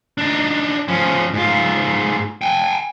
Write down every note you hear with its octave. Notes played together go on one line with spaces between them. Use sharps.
D4 D#4
F3 C#4
G#2 F4
G5 G#5